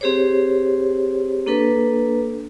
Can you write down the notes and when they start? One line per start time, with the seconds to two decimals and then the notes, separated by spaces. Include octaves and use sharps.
0.01 C4 G4 G#4 C5 C#5
1.46 A#3 D4 A4 B4